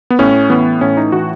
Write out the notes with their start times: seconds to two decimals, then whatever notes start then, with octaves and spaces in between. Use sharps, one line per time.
0.10 B3
0.19 A2 C#4
0.50 E3 B3
0.81 A2 C#4
0.97 D#4
1.12 E3 F#4